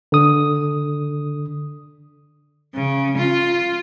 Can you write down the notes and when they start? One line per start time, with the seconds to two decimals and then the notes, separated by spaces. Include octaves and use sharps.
0.12 D3 D#6
2.74 C#3
3.17 F4